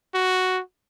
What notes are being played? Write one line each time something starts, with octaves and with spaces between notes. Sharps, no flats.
F#4